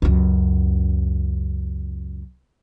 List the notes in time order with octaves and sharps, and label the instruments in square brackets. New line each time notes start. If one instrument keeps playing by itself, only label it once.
[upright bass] C#2 F#2